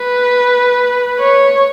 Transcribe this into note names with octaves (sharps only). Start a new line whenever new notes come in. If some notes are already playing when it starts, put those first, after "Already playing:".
Already playing: B4
C#5